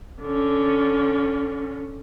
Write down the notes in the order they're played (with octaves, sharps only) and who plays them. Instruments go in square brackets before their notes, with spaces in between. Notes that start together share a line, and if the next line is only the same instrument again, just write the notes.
[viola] D3 C#4